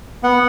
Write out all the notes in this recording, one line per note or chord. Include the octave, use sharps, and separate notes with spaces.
B3 F#5